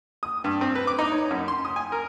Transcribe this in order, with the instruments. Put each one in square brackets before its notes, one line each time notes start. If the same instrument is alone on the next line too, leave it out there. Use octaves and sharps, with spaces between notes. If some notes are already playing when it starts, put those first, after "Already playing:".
[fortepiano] D#6
G2
C4
B4
D6
D#4
C#5
F#2
C6
D#6
G#5
A#4